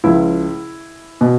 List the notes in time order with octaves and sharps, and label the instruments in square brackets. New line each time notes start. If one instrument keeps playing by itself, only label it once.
[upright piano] C#2 C#3 F3 E4
B2